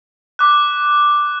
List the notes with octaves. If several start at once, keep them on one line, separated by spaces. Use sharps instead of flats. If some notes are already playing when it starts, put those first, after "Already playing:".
D6 F#6